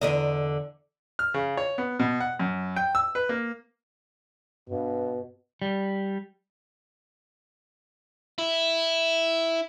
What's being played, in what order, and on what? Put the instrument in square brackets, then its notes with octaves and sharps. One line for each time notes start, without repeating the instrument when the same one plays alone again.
[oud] E2 D3 D#5
[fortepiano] F6
C#3
C#5
B3
B2
F#5
F#2
G5
E6
B4
A#3
[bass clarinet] G2 [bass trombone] B2
[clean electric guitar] G3
[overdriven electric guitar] E4